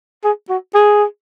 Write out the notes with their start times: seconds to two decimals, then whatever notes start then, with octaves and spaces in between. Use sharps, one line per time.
0.24 G#4
0.49 F#4
0.74 G#4